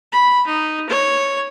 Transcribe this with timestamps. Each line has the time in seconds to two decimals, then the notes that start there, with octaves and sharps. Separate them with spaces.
0.13 B5
0.47 D#4
0.89 C#5